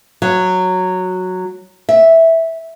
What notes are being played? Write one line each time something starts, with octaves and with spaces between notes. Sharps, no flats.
F#3
E5